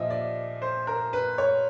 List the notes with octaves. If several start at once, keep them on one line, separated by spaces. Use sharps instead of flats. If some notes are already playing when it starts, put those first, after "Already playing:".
Already playing: A#2 F3 D#5 E5
D5
C5
A#4
B4
C#5